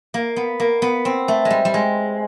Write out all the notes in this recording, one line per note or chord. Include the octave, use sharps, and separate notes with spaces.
A#3
B3
A#3
B3
C4
A3
G#3
G3
G3
G#3